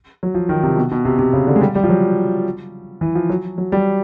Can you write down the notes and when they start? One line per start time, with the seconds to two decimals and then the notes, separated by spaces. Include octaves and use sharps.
0.23 F#3
0.35 F3
0.49 D#3
0.63 C3
0.77 B2
0.91 B2
1.05 C3
1.19 C3
1.33 C#3
1.47 D3
1.56 G#3
1.61 G3
1.75 G3
1.84 F3
1.89 F#3
3.01 E3
3.15 F3
3.29 F#3
3.58 F#3
3.72 G3